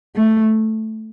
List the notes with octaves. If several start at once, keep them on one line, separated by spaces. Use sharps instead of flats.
A3